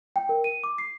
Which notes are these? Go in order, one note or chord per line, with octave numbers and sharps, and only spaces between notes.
G5
A#4
D#7
D6
C7